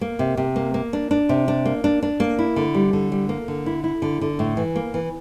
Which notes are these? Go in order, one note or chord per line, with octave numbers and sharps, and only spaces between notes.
A#3
C3
C3
A#3
A#3
D4
D4
C3
D4
A#3
D4
D4
A#3
E4
D3
G3
D3
G3
A#3
D3
E4
E4
D3
D3
A2
E3
A#3
E3